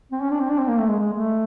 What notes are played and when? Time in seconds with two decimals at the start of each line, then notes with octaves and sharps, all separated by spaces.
0.12 C4
0.22 C#4
0.31 D4
0.40 C4
0.50 D4
0.59 C4
0.69 A#3
0.78 A3
0.88 G#3
1.00 G#3
1.13 A3